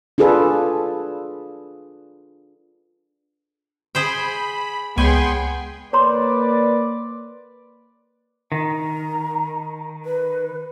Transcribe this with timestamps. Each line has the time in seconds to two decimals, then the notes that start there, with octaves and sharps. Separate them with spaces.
0.18 D4 F4 G#4 A4 B4
3.95 G#4 C5 G5 B5
4.98 C#2 B3 G#4 G5 G#5 B5 C6
5.93 A#3 B4 C#5 D5 A#5 C6
8.52 D#3 A#5
10.05 B4